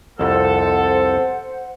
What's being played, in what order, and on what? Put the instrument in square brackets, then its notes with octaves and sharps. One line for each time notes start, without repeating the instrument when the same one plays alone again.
[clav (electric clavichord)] C2 F2 [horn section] A4 [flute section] C5 F#5